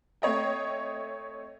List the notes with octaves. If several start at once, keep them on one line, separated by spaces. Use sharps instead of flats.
A3 C4 C#5 D#5 G5